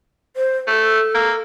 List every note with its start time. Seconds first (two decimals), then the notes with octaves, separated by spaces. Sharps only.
0.36 C5
0.68 A3 A4
1.15 A#3